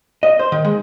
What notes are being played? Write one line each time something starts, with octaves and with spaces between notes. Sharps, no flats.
D#5
C5
D#3
G#3